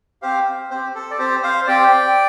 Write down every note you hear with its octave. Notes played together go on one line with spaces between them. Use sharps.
C4 G4 C5 F5
C4 G4 C5
A4
D5
C4 G4 C5
C5 F5
C4 G4 D5 G5